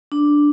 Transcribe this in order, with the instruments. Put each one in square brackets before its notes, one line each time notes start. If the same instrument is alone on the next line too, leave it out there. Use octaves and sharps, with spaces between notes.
[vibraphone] D4